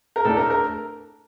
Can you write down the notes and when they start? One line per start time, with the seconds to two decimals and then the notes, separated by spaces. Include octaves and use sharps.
0.16 A#4
0.25 A2 A3 D4 A4
0.37 A#4
0.50 A#4